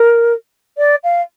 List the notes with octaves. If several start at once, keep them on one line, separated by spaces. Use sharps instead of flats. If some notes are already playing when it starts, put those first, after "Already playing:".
Already playing: A#4
D5
F5